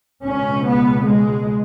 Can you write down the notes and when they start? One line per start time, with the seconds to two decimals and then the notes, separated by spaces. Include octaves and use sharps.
0.23 C#2 B2 C#4
0.63 B3
1.05 G#3